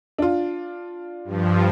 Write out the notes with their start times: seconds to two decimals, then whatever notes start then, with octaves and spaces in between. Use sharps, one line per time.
0.19 D4 F4
1.24 G2 F3